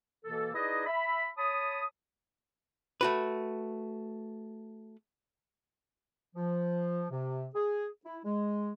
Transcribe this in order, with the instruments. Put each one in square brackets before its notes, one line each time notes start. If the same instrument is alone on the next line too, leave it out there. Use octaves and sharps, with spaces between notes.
[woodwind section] B2 E3 A#3 A4
D#4 E4 G#4 B4 D5 D#5
E5 B5
C#5 A5 B5 D#6
[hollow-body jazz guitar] A3 F#4 B4
[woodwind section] F3
C3
G#4
E4
G#3